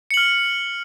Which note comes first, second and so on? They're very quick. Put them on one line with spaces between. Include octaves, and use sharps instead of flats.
C#7 F#7 F6